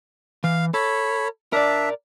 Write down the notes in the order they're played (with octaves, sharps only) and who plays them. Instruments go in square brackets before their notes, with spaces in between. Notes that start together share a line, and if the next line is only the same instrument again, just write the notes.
[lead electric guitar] E3 [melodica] F5
[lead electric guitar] A4 [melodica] C#5 B5
[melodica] D4 E5 [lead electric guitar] A#4 D5